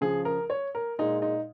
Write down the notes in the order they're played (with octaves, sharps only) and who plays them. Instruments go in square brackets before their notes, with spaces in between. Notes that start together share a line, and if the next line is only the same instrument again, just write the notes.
[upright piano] C#2 C#3 F3 G#4
A#4
C#5
A#4
A#2 G#3 D#4
D#4